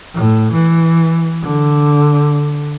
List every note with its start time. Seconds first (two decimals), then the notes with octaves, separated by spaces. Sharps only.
0.14 A2
0.53 E3
1.43 D3